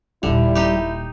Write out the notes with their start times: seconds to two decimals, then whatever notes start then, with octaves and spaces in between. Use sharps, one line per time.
0.23 D#1 A#2 D3 G3 E4
0.55 D#4 G4